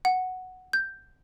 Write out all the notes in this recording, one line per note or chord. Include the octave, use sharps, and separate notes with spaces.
F#5
G6